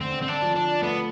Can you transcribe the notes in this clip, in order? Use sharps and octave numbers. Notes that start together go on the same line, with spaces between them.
D3 C4
C4
D4
F3
D4
A3 B3